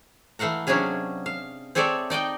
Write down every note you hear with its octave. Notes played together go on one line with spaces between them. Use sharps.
E3 A3 F5 F#5 A#5
C3 F#3 C#4 D4 G#4 F5
F5
C4 G#4 A4 C#5 D5 E5
D#4 D5 D#5 G5